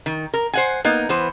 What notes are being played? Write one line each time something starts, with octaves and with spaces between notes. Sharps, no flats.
D#3
A#4
C5 F#5 G#5
A#3 B3 D#4
E3 B3 C5